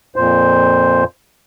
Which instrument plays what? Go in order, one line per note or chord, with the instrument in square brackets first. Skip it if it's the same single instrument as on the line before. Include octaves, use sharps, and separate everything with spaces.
[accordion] F2 A#2 C5